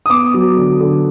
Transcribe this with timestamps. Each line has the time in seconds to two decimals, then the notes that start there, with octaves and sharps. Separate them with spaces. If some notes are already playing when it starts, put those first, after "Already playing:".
0.06 D#6
0.09 B3 D6
0.34 F#3
0.56 D3
0.80 D3